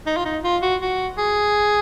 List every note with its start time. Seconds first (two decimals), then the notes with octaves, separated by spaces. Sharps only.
0.06 D#4
0.17 F4
0.26 D#4
0.44 F4
0.62 F#4
0.82 F#4
1.18 G#4